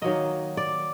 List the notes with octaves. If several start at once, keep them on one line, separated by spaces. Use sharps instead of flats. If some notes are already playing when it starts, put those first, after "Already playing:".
D#3 F#3 A#3 D#5
D5